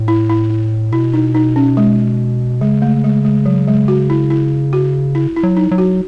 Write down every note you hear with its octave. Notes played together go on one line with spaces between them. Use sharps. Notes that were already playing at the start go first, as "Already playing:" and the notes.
Already playing: A2
E4
E4
E4
B2 E4
D#4
D#4
C#4
G#3
C#3 G#3
A3
G#3
G#3
F#3
G#3
F#4
E4
E4
F#4
E4
E4
F#3
D#4
F#3
F#4